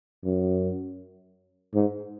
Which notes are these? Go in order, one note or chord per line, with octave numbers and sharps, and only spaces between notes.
F#2
G#2